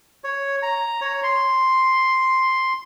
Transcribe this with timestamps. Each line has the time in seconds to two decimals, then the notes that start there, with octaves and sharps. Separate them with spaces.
0.24 C#5
0.63 A#5
1.02 C#5
1.24 C6